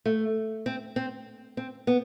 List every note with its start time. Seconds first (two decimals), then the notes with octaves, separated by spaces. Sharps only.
0.05 A3
0.66 C4
0.96 C4
1.57 C4
1.87 B3